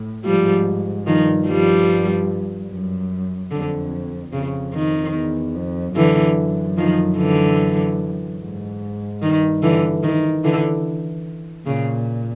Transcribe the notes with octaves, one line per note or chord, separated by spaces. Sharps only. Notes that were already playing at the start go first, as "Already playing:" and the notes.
Already playing: A2
G#2 F3 G3
G2 D#3 F3
F3 G3
F#2
F2 D3
F2 C#3
D#3
E2
F2
F#2 D3 E3
D#3 F3
D3 E3
G#2
G2 D#3
D3 E3
D#3
D3 E3
A#2 C#3